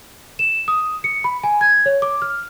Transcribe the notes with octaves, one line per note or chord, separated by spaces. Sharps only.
E7
D#6
C#7
B5
G#5
G#6
C#5
D6
F6